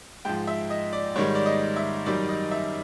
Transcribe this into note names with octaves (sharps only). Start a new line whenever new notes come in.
G#2 F3 G5
E5
D#5
D5
G#2 D#3 G3 C#5
D5
D#5
E5
F#2 D#3 G3 D5
D#5
E5